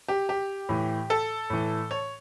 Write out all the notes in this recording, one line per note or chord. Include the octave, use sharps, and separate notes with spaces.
G4
G4
A2 E3
A4
A2 E3
C#5